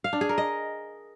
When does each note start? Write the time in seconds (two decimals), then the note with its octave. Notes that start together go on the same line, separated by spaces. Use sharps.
0.04 F5
0.13 D4
0.21 G#4
0.29 A#4
0.38 D#5